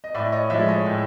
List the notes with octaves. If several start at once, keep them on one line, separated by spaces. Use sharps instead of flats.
D#5
A2 D5 E5
C#5 D#5
F3 G#3 D5 E5
C#5 D#5
A2